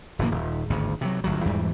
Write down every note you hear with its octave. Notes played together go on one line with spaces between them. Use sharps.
F#1 A2 E3 A#3
D#1
G#1 D2 G2
C3 D#3 F#3
G1 D2 F#3
E2 G#2 E3 G3